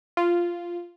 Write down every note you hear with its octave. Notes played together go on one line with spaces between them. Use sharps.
F4